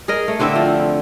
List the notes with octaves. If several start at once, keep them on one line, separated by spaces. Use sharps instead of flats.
G#4 A#4 D#5
A3
D3 C4 E4 E5
F3